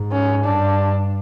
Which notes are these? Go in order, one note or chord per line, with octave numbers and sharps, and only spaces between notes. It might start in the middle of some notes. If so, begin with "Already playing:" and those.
Already playing: G#2
C#4
G2 D4